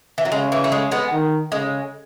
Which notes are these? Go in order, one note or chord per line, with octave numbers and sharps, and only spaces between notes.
E3
F#3
C#3 G#3
E3
A3
G#3
G#3 B3
D#3
C#3 G#3